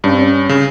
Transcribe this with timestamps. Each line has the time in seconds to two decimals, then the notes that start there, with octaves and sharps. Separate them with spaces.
0.04 G2 C#4
0.13 C4
0.22 C#4
0.49 C#3